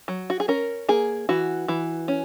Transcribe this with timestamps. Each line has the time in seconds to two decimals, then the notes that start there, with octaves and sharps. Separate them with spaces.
0.08 F#3
0.30 F#4
0.40 G#4
0.48 C#4 A#4
0.89 A#3 G#4
1.29 E3 F#4
1.68 E3
2.08 C#4